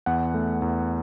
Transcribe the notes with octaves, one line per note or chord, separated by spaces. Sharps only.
E2 F#5
A3
E2